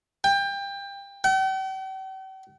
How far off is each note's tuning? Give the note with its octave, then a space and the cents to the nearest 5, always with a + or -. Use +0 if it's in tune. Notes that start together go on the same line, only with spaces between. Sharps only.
G5 +25
G5 -45